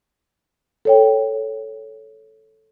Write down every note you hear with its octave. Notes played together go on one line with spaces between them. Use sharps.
A4 C#5 G5